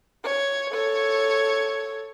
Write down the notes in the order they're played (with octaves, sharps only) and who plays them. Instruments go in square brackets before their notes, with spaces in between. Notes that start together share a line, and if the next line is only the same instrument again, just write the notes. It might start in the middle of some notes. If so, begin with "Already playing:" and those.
[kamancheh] C#5
A4 C#5